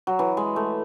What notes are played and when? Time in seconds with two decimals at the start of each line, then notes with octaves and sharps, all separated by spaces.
0.07 F#3
0.19 E3
0.37 G#3
0.56 A3